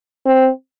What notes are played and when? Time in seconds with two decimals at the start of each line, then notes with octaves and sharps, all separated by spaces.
0.26 C4